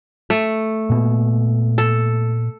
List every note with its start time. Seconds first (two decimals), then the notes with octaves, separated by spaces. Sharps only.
0.30 A3
0.90 A#2 B3
1.78 A4